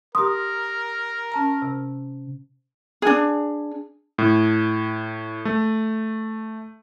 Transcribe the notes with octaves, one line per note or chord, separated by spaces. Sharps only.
G4 A#4 C6 D#6
C#4 A5 A#5
C3
D4 G#4
A2
A3